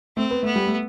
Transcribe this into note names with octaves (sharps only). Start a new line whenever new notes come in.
A3 C4
B3
A3 B3
G3
A3